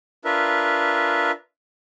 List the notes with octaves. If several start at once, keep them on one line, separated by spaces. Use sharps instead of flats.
D4 F4 A#4 B4 E5